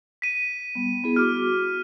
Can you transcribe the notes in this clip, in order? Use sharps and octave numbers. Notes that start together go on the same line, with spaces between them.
B6 D#7
G3 B3
B3 E4 G#4
F#4 D6 F6